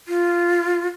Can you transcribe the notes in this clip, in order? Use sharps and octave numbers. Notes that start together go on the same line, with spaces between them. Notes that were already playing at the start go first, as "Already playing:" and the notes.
F4